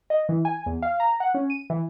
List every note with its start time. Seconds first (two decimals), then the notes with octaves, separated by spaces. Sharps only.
0.10 D#5
0.29 E3
0.45 G#5
0.66 E2
0.82 F5
1.00 A#5
1.20 F#5
1.34 C#4
1.50 D#7
1.70 E3